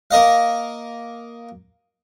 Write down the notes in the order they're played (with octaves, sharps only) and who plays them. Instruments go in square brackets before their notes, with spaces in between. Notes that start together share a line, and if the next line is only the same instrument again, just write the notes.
[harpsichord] A#3 A#4 D#5 F5